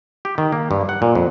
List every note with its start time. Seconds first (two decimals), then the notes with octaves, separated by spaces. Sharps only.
0.25 G4
0.38 D#3
0.52 A#3
0.71 G2
0.89 F#5
1.02 A#2
1.15 F2